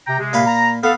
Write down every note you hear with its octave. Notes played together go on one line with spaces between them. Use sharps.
C3 G5 A#5
C3 G#3
A#2 F5 B5
A#5
B3 A4 F5